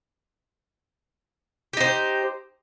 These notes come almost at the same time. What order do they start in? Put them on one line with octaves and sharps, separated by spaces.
G4 D#4 C5